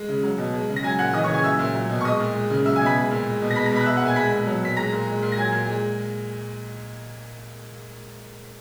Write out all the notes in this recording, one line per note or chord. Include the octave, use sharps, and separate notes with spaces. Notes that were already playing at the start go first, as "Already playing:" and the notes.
Already playing: G#3
C#3
F#3
B2
G#3
C#3
A#6
F#3 G#5 G#6
A#2 F#5 F#6
E3 D#5 D#6
C#5 C#6
C#3 G#5 G#6
F#3 E5 E6
A#2
F#3
B2
C#6
G#3 D#5 D#6
A#2
G#3
C#3
F#3 E5 E6
G#5 G#6
B2
B5 B6
G#3
A#2
G#3
B2
A#6
G#3 B5 B6
A#5 A#6
B2 B5 B6
F#6
G#3 E5 E6
F#5 F#6
A#2 G#5 G#6
G#3 B5 B6
B2
F#3
A#2 B6
G#3 A#5 A#6
A#2
G#3
A#2
A#6
F#3 G#5 G#6
A#2
G#3